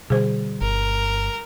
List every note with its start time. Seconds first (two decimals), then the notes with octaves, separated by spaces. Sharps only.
0.10 B2 D3 G3 G#4 C5
0.61 G1 A#4